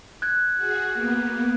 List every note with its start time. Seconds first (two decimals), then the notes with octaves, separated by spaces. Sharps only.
0.22 F#6 G#6
0.56 F#4 G#4
0.94 A#3 B3